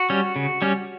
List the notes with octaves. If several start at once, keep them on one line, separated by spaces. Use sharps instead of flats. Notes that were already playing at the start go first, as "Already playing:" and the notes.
Already playing: F#4
G3 C#4
C#3
G3 C#4